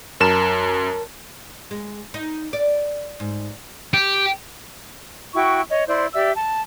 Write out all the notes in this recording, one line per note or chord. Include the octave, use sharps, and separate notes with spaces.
F#2 A#4 A5 E7
G#3
D#4
D5
G#2
G4
E4 F#4 G5 C#6
C#5 D#5
E4 C5 D5 C6
G4 D5 E5 E6
A5